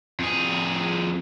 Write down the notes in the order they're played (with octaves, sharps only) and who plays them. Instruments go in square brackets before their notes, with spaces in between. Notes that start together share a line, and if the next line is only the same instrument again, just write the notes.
[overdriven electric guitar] F2 G#4